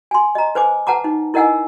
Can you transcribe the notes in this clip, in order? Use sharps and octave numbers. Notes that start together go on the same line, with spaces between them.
G#5 C6
D#5 A#5
B4 C5 G#5 D6
B4 F#5 A5 A#5 D6
D#4
E4 A#4 D#5 F#5 G#5 E6